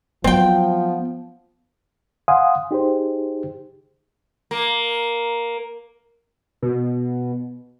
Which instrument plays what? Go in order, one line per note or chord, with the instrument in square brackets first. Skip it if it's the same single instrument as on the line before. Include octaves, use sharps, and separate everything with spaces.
[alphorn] F3 [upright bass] F#3 [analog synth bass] B3 [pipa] C4 G5
[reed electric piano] F5 F#5 G#5 C6 D#6
D#4 G4 G#4 C5
[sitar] A#3
[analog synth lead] B2